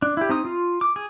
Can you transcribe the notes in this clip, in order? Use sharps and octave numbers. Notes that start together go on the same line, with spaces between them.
D4
E4 G4
C4 D#4 D#6
F4
D6
G#4